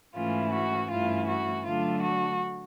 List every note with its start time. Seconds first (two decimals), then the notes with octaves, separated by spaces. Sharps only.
0.16 G#2 E3 A3 C#4 E4 F4
0.53 F#4
0.91 G2 E3 A3 C#4 E4 F4
1.29 F#4
1.66 D3 F#3 A3 D4 F4
2.03 F#4